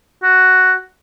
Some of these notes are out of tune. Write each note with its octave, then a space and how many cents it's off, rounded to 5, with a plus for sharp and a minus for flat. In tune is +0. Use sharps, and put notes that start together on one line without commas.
F#4 +5